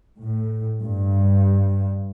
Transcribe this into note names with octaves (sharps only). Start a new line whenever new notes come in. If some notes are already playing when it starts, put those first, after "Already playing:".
A2
G2